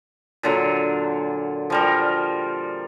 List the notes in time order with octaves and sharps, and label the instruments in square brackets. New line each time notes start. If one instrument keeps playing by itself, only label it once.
[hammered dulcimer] A#2 D3 F#3
F3 G3 A#4